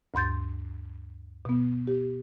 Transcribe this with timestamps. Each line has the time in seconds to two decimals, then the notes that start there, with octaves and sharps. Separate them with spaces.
0.14 D2 G2 C6 G6 A6
1.45 B2 B3
1.87 G4